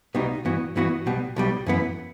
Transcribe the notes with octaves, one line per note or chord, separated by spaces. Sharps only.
C2 B2 G3 D#4
G2 E3 B3 F#4
G2 E3 B3 F#4
B1 B2 G3
B1 B2 G3
F#2 E3 B3